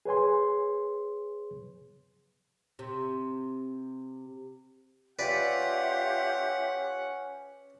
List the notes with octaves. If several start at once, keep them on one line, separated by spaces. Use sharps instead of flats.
G#4 B4 C#5 G#5 C6
C3
C#4 F4 G4 B4 D5 E5 F#5